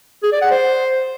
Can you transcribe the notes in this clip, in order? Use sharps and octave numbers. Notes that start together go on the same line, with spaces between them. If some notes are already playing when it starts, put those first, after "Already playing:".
G#4
D5
F#5
C5